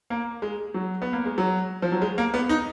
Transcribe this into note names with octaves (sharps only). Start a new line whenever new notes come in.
A#3
G#3
F#3
B3
A#3
G#3
F#3
F3
F#3
G#3
A#3
B3
D#4